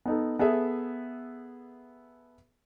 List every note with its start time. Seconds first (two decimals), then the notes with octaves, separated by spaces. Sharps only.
0.06 B3 D#4 A4
0.39 B3 G#4 A4 E5